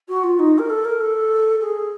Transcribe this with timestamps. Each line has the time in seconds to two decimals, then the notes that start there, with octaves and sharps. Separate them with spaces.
0.08 F#4
0.23 F4
0.39 D#4
0.58 A#4
0.69 A4
0.84 A#4
1.00 A4
1.60 G#4